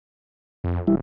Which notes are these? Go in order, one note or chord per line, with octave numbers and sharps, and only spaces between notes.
F2
E1 G3 E4